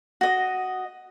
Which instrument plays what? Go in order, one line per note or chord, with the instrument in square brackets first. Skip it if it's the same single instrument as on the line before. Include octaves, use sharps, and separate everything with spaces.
[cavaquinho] F#4 D#5